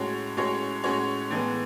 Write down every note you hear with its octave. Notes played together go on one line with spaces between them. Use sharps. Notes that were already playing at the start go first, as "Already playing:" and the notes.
Already playing: A2 G#3 C#4 F#4 C#5
A2 G#3 C#4 F#4 C#5
A2 G#3 C#4 F#4 C#5
A2 E3 G#3 B3